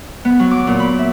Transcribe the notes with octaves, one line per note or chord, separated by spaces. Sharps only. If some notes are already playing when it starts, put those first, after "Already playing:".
B3
F#3
D6
A#2
B5
E5